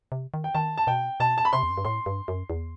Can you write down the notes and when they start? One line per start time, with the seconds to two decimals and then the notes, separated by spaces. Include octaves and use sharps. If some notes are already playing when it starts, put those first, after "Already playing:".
0.12 C3
0.34 D#3
0.44 G5
0.54 D#3 A5
0.77 A5
0.87 B2 G5
1.20 B2 A5
1.38 A5
1.45 B5
1.53 C3 C6
1.63 E2
1.70 F#2
1.77 G2
1.85 A2 C6
2.06 G2
2.28 F#2
2.50 E2